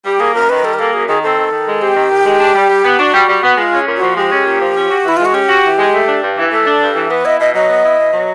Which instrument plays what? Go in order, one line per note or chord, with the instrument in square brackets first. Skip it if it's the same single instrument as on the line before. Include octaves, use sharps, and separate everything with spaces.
[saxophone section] G3 [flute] G4
[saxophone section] A#3 [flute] G#4
[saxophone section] F#2 [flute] A#4
[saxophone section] D#3 [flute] B4
[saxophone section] G3 [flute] A4
[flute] A#4
[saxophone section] A#3 [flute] A4
[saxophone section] F#2 [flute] G#4
[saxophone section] D#3 [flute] G#4
[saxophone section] C4 [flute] A4
[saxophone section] D#3
D#3
G#3
[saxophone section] C4 [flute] G4
[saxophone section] D#3
D#3
G#3
D4
G3
G3
B3
[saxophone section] D4 [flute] F#4
[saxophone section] G3
G3
B3
[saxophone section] G#3 [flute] F4
[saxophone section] C#4
A#2
[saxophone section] F3 [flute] F#4
[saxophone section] G#3 [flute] G4
[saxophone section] C#4
A#2
F3
C#4
F#4
[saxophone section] E3 [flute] E4
[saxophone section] G#3 [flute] F4
[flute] F#4
[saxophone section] C#4 [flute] G4
[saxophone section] F#4
E3
G#3
A3
D4
G2
E3
[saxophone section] A3 [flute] A4
[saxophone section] D4
G2
E3
[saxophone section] B3 [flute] B4
[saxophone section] E4 [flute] D#5
[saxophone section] B2 [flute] D#5
[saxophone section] F#3 [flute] D#5
[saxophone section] B3
E4
B2
F#3